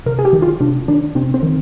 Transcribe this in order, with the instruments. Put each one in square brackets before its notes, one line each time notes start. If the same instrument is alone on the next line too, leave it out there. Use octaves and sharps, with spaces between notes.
[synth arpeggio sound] C3 A#4
G#4
G4
D#3
F4
C3 D4
D#3 D4
C3 C4
C4
D#3